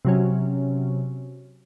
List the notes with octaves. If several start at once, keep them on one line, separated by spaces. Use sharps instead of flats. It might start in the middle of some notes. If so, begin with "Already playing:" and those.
C3 F#3 C#4